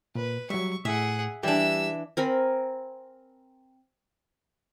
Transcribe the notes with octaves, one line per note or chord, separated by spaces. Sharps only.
A#2 B4
F#3 G3 E5 C#6
A2 G#4 E5 F#5
E3 G3 D4 G4 E5 E6
C4 A#4 G#5 B5